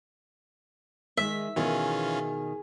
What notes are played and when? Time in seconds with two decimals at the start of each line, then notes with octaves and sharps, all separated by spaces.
1.17 D#3 G#3 E5
1.56 B2 D#3 E3 C#4 F4 G#4